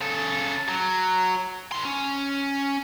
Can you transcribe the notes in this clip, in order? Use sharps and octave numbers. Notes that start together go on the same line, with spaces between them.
C#3 A4
F#3
D#3 C6
C#4